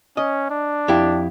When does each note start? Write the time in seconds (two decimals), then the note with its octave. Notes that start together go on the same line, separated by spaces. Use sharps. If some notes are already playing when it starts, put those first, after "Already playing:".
0.17 C#4 D#5
0.50 D4
0.88 F2 E4 G4